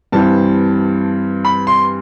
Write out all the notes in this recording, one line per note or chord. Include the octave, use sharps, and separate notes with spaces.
G2 E3 G3 C4 A5
B5
C6